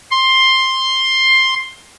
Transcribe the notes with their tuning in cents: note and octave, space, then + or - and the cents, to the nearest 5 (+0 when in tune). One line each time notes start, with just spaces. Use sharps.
C6 +10